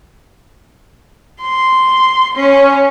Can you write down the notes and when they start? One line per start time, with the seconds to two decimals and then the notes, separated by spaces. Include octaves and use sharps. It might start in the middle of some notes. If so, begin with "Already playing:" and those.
1.42 C6
2.36 C#4